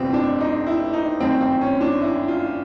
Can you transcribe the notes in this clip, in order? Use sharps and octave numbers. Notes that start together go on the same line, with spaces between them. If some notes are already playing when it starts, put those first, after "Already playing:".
Already playing: G1 F2 C3 B3 C4
D4
D#4
E4
D#4
G1 F#2 D#3 C4
C4
C#4
D4
E4
F4